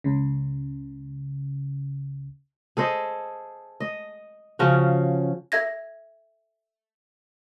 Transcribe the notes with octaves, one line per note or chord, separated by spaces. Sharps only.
C#2 C#3
G#4 A4 C5 D#5
D#5
C#3 F3 C#4 F#4
A4 E5 G#6 A#6